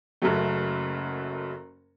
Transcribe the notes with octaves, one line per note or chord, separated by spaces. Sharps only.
F#1 F#2 C#3 F#3 A3